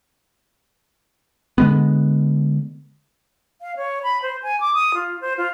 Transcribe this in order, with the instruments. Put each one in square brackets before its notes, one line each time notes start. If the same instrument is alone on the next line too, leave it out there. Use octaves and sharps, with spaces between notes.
[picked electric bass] D3 G#3 B3
[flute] F5
C#5
B5
C5
G#5
D6
D#6
F4
C5
F4